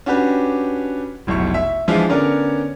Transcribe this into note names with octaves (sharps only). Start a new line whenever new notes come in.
C#4 D4 F#4 G4 B4
F1 B1 E4 C#6
E5
E3 F3 G#3 D4 E4 F4
D3 B3 C#4 A#4 C#5 D5